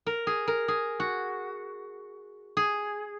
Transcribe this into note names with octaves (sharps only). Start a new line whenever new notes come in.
A#4
G#4
A#4
G#4
F#4
G#4